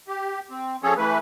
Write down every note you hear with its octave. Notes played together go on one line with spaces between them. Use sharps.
G4
C4
F3 C#4 G#4 A4 C#5
E3 A3 B4